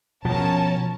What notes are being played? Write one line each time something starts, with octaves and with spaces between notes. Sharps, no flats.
B2 F3 C#4 A#4 A5